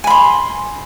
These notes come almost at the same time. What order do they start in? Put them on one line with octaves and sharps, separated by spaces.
G#5 B5 C6